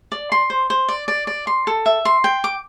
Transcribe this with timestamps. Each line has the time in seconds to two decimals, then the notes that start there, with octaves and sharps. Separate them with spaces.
0.12 D5
0.32 C6
0.50 C5
0.70 C5
0.89 D5
1.08 D5
1.27 D5
1.47 C6
1.67 A4
1.86 E5
2.05 C6
2.24 G5
2.44 D6